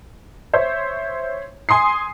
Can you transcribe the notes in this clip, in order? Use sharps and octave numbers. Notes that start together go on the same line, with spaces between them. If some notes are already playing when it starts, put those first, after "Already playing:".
C5 C#5 E5
G#5 C6 D#6 C7